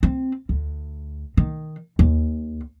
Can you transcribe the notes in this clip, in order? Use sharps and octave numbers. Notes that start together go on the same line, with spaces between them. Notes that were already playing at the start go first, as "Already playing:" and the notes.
C4
D2
D#3
D#2